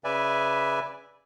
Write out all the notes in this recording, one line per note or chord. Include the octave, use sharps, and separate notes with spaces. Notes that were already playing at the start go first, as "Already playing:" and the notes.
C#3 B4 D5 E5 G#5